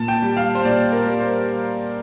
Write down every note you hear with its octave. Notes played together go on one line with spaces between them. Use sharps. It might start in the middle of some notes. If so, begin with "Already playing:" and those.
Already playing: A#2 A5
G5
G3
F5
C5
A#2 D5
A#4
G3
C5